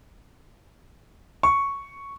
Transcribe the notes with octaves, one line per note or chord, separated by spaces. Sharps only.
C#6